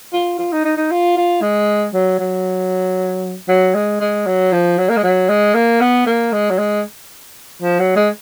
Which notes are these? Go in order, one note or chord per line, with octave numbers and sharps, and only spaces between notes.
F4
F4
D#4
D#4
D#4
F4
F4
G#3
F#3
F#3
F#3
G#3
G#3
F#3
F3
F#3
A#3
G#3
F#3
G#3
A#3
B3
A#3
G#3
F#3
G#3
F3
F#3
G#3